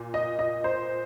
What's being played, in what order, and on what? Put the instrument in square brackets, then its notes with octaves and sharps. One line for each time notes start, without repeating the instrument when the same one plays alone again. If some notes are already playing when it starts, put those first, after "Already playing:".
Already playing: [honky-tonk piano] A#2
D#5
D#5
C5